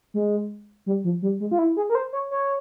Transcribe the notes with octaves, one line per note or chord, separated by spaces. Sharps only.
G#3
G3
F3
G3
G#3
F4
E4
G#4
A#4
C5
C#5
C#5